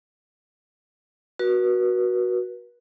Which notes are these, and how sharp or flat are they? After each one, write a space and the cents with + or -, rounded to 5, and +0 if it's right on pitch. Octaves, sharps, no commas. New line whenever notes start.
F#4 +0 B4 -40